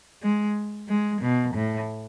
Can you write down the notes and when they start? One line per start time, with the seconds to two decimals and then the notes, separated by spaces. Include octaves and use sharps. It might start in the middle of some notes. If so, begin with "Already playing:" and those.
0.23 G#3
0.89 G#3
1.22 B2
1.54 A2